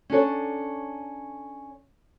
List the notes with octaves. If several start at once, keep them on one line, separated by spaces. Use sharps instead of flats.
C#4 D4 A4 C#5